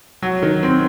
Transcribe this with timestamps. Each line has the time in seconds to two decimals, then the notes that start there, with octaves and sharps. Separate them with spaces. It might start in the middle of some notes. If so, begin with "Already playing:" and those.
0.22 F#3
0.42 D#3
0.63 C4